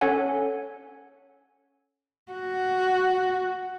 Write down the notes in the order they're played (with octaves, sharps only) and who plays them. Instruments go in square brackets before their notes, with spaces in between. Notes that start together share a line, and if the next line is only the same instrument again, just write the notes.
[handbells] C#4 A4 C#5 F#5 G#5
[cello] F#4